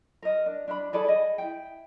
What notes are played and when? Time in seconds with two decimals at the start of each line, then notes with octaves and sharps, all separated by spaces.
0.22 A#4 D#5
0.46 D4
0.68 D4 E5 B5
0.93 G#4 A4 D5 B5
1.08 G#4 D#5
1.38 E4 G5